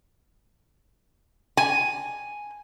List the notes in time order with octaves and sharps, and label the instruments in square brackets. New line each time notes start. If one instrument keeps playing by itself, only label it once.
[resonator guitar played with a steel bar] G#5